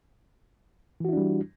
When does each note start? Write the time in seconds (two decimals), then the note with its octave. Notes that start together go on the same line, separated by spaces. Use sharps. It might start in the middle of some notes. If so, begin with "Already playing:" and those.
1.00 E3
1.05 F#4
1.09 E4
1.13 D4
1.17 G3